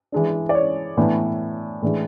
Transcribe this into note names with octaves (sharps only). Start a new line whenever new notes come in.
E3 G#3 D4
D5
C#5
A2 E3 B3 D4
A2 E3 G#3 D4